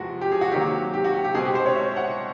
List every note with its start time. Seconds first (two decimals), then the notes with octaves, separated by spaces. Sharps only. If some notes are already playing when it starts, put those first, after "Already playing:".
Already playing: E2 C3 F3 G#3 C4 F#4
0.21 G4
0.32 G#4
0.41 F#4
0.52 C3 D#3 F#3 A#3 G4
0.94 G4
1.04 F#4
1.14 G4
1.24 G4
1.35 B2 G#3 C4 G#4
1.45 G4
1.55 C5
1.66 C#5
1.76 E5
1.96 F#5